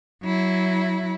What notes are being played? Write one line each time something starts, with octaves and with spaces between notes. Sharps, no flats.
F#3 E4